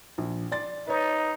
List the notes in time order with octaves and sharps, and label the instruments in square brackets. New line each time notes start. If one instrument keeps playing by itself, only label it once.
[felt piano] A#1
D5 C6 A6
[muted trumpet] D#4 [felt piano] B4 C#5